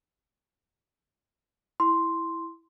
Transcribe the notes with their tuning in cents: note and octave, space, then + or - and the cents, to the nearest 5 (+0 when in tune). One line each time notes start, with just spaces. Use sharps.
E4 +0 C6 +0